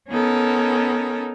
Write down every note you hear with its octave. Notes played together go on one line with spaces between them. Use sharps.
B3 C#4 D#4 A4 A#4